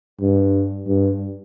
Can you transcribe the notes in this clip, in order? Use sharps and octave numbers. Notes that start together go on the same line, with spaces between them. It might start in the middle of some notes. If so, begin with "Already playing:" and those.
G2
G2